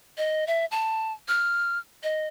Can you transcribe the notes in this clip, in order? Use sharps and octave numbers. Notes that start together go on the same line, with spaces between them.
D#5
E5
A5
F6
D#5